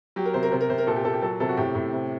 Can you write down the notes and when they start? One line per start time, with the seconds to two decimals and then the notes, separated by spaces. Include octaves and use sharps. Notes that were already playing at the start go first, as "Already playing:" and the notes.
0.16 F#3 G4
0.25 A#4
0.34 C3 C5
0.43 A#4
0.52 C3 C5
0.61 A#4
0.69 C3 C5
0.78 A#4
0.87 A#2 A4
0.96 G4
1.05 A#2 A4
1.13 G4
1.22 F#3 A4
1.40 C3 A4
1.49 F#4
1.57 A2 G4
1.75 A2
1.93 C3